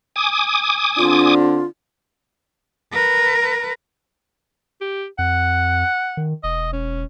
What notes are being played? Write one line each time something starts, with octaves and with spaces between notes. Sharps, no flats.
G#5 D6 D#6
D3 C4 D4 F4
A#4 B4
G4
F2 F#5
D#3
E1 D#5
C#4